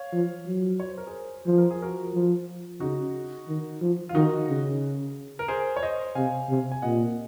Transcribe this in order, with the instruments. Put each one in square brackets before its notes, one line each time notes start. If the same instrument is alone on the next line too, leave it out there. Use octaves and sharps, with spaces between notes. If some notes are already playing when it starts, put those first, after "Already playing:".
Already playing: [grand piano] C#5 F5
[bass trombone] F3
F#3
[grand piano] C#5
C5
A#4
G#4 C5
[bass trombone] F3 [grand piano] C5
[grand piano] A#4
G#4
F#4 A#4
[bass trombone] F3
[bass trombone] C#3 [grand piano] D#4 F#4
[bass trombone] D#3
F3
[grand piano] F4
[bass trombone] D#3 [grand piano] D#4 F#4
[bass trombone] C#3
[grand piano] A#4
G#4 C5
C#5
C5 D#5
[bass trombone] C3 [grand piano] F5 G#5
[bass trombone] C3
[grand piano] G#5
[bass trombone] A#2 [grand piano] D#5 F#5